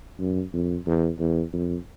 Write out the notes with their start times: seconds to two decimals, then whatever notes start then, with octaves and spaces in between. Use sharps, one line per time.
0.19 F#2
0.53 F2
0.86 E2
1.19 E2
1.53 F2